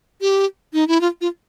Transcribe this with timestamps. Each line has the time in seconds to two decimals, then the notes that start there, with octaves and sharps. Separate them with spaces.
0.21 G4
0.73 D#4
0.88 E4
1.01 F4
1.21 F4